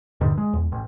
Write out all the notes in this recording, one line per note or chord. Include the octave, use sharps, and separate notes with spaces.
D#1 G2 D3 D#3
G#3
E2
A1